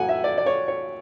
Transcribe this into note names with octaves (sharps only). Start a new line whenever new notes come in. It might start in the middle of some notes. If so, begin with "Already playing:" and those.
Already playing: A2 F#3 F#5 G#5
E5
D5
D5
C#5
C#5